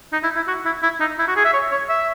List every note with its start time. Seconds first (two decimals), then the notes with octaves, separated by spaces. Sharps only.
0.13 D#4
0.23 E4
0.36 E4
0.48 F#4
0.65 E4
0.83 E4
1.00 D#4
1.19 E4
1.28 F#4
1.36 G#4
1.45 E5
1.53 C#5
1.71 C#5
1.89 E5